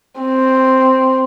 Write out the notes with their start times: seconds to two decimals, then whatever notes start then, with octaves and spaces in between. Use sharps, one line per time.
0.21 C4